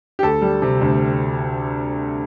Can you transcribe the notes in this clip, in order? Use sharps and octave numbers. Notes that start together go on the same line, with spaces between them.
G4
D2 A4
G3
C3
D2